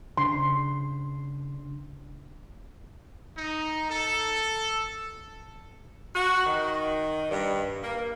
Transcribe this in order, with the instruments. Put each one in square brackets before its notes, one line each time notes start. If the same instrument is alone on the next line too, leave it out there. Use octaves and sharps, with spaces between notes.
[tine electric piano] C#3 D4 [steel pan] C6
[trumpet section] D#4
A4
[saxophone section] F#4
D#3
G2
A#3